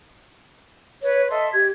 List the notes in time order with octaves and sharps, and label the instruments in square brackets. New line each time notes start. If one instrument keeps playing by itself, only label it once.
[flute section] B4 [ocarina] C#5
[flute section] A4 E5 C6 [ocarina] D#5
[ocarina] G4 [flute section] G#6